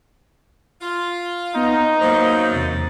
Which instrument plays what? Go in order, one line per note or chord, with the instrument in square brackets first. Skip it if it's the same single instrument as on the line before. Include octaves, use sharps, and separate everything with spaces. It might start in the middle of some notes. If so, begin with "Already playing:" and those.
[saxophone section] F4
[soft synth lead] B3 [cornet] D#4
[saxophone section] F#2 [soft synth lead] A#3 [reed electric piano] C5 F5
[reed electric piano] E2 C3 [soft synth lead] A6